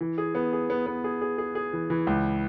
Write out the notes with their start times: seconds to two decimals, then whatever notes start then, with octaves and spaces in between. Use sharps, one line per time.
0.01 E3
0.18 G#4
0.35 B3
0.53 G#4
0.70 B3
0.86 B3
1.04 G#4
1.22 G#4
1.38 G#4
1.55 G#4
1.73 E3
1.90 E3
2.07 C#2